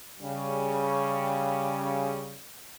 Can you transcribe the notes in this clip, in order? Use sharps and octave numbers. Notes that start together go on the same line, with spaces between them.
C#3 G3